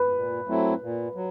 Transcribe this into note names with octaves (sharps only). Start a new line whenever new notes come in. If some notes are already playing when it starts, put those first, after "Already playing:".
Already playing: B4
A#2
F#3 A3 C4 E4
A#2
F#3